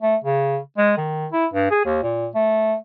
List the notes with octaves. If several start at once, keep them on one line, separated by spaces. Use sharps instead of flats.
A3
C#3
G#3
D#3
E4
G2
G#4
D#2
A#2
A3